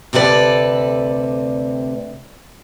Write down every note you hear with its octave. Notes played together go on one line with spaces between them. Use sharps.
D2 C3 A4 B4 D5